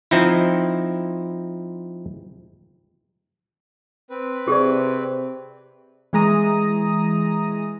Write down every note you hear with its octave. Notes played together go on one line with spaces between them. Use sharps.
F3 C4 D#4 E4
C4 B4
C3 G4 G#4 D5
E3 G#3 A#5 D#6